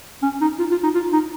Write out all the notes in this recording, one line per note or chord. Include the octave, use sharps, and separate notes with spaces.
C#4
D#4
F4
F4
D#4
F4
D#4